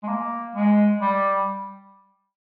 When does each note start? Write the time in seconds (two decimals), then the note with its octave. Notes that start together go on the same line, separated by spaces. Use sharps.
0.03 G#3
0.08 A#3
0.55 G#3
1.01 G3